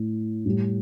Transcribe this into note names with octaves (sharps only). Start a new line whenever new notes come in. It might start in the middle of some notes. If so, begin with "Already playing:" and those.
Already playing: A2
A2 G3